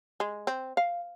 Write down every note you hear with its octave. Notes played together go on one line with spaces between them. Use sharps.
G#3
C4
F5